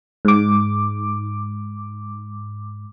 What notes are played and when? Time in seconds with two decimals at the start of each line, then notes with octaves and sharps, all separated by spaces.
0.25 G#2 D6